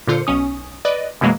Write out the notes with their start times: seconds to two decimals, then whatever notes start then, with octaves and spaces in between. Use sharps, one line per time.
0.07 A#2 D3 F4 C5 C#7
0.27 B1 C#4 D#6
0.85 B4 D5 D#5
1.21 F#2 B2 E3 G#3 A#3